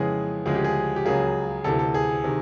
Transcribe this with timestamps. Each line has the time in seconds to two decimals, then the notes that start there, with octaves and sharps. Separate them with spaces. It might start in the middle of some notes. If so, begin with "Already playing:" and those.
Already playing: F2 C#3 E3 G#3 B3 G#4
0.46 D2 C#3 F3 G#3 G#4
0.55 G4
0.64 G#4
0.96 G4
1.05 C#2 C#3 F#3 A#3 G#4
1.64 D2 C3 E3 A4
1.79 A4
1.94 G#4
2.24 C3 D#3